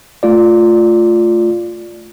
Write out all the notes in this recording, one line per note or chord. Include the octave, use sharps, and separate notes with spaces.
A3 F4 D5